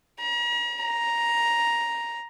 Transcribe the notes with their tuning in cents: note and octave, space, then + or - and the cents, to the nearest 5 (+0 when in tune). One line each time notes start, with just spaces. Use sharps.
A#5 +40
A#5 +10